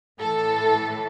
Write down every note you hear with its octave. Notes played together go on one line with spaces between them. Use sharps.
A2 E3 A4